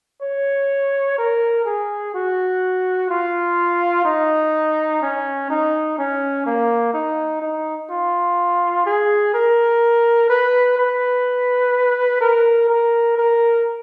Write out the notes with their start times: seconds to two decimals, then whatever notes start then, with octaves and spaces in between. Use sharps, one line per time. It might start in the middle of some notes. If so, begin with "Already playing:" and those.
0.22 C#5
1.18 A#4
1.65 G#4
2.14 F#4
3.10 F4
4.05 D#4
5.02 C#4
5.50 D#4
5.98 C#4
6.46 A#3
6.94 D#4
7.41 D#4
7.90 F4
8.86 G#4
9.34 A#4
10.30 B4
10.78 B4
12.21 A#4
12.70 A#4
13.18 A#4